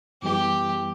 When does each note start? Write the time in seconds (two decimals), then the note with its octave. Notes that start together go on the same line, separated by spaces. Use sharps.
0.22 F#2 E3 G3 B3 E4 G4